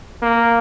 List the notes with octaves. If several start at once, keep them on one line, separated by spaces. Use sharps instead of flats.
A#3